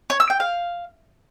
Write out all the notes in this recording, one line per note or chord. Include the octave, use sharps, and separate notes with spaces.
C#5
E6
G5
F5